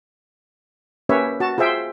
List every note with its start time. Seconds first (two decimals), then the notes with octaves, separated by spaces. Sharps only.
1.09 A#3 C#4 G4 B4 C#5 E5
1.40 F#4 A5
1.58 F4 G#4 C5 E5 G5